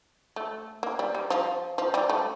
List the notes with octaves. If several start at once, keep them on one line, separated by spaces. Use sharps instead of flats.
A3
A#3
G3
G3
F3
F3
G3
A3